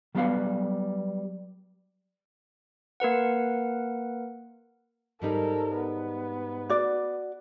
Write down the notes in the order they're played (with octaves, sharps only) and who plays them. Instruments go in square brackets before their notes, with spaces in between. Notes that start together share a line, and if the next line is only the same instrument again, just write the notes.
[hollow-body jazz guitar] F#3 G3 B3 B4 C5 F5
[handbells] A#3 A#4 B4 F#5
[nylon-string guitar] G#2 G3 D#4 [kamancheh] A4 A#4
[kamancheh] B3
[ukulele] F#4 D5